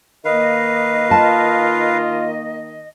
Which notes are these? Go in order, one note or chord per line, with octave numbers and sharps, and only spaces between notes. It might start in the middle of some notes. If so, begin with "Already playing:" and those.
D#3 A#3 B4 D#5 F5
F4 A5